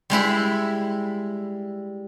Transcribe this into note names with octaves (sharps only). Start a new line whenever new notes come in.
G3 G#3 E4 B5